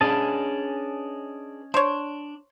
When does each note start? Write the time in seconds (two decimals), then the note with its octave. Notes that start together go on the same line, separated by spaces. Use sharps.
0.01 C#4 D4 G#4 B4 D#5 A5
1.74 D4 C5 C#5